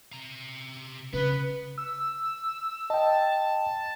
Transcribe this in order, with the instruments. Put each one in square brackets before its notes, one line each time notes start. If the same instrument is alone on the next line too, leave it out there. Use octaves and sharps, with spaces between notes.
[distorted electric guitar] C3 A#5
[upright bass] C#3 [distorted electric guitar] B3 [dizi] B4
[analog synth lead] E6
[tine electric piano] D#5 G5 [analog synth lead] A5